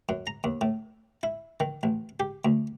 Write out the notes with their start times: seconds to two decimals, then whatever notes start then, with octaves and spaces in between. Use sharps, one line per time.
0.09 F#2
0.27 A#5
0.44 D#2
0.61 A2
1.23 E4
1.60 D#3
1.83 A1
2.20 G4
2.45 D2